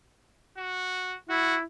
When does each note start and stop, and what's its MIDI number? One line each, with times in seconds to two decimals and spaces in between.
0.58 1.17 66
1.29 1.62 64
1.29 1.56 66